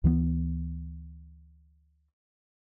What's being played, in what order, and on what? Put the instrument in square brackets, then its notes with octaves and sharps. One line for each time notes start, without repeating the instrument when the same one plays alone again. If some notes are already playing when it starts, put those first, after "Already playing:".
[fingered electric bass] D2 E3 G3 B3